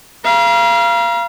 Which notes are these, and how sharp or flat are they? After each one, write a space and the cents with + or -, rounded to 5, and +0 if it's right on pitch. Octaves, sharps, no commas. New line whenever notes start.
F5 -25 A#5 +40